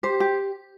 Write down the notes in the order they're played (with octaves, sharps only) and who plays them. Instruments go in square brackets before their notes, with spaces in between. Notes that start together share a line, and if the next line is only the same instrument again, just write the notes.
[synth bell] G4 [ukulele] C5
[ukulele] G4